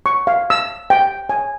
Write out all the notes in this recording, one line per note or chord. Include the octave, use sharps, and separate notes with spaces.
C#6
F5
E6
G5
G#5